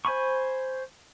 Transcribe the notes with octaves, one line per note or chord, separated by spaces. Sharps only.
C5 G#5 B5 C#6